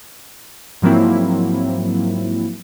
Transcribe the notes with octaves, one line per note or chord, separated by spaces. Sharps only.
G#2 F3 F#3 A#3 C4 E4